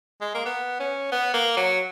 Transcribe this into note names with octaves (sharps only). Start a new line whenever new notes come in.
G#3
A#3
B3
C#4
B3
A#3
F#3